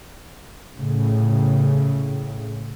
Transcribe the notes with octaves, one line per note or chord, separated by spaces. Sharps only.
A2 C#3